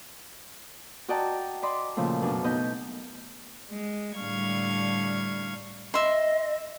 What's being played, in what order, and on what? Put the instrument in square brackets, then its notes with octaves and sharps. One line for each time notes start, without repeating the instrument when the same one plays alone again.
[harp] F#4 D5 D#5 G5 A5 A#5
D5 D#5 B5 C6 D6
A#2 C#3 F3 A3
F#2 B2 D4
B3 D#4 D#5 B5 G6
[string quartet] G#3
A2 D3 G3 F5 C#6 G#6
[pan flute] D#5 [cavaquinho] E5 C6